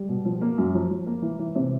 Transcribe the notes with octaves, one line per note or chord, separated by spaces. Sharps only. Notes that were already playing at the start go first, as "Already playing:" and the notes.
Already playing: G3
B2
F3
A#3
F#2
F3
F3
A#3
E3
E3
C3